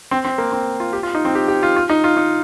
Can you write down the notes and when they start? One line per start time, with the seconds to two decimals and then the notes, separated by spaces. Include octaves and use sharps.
0.11 C4
0.25 C4
0.38 A#3
0.52 C4
0.80 F4
0.93 G4
1.03 F4
1.15 D#4
1.25 C4
1.35 G4
1.48 G4
1.63 F4
1.77 F4
1.90 D#4
2.04 F4
2.17 D#4